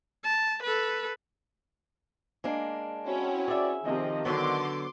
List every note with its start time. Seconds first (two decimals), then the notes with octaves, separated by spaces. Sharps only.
0.25 A5
0.63 A4 B4
2.44 G#3 A#3 D4
3.05 C4 C#4 E4 F#4
3.48 G#4 D5 E5
3.84 C3 D#3 F3 D#5
4.25 D3 F#3 B3 C6 D6